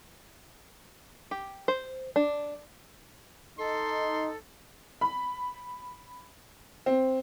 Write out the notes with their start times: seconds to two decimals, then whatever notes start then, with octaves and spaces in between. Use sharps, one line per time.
1.31 G4
1.68 C5
2.16 D4
3.58 D#4 A4 C6
5.01 B5
6.86 C4